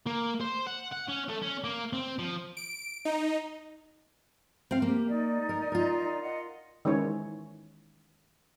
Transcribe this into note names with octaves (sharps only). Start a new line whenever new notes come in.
A#3
C5
F#5
F#5
C#4
A3
C#4
A#3
C4
F3
D7
D#4
C4 F5
A#3 G4
D#4 D5
A#4
F4 A#4
D#5 F#5
D#3 E3 G#3 C#4 C5 C#5